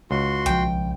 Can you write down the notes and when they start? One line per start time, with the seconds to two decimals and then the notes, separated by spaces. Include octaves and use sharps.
0.11 C#2 F#4 C6
0.46 B1 F3 G5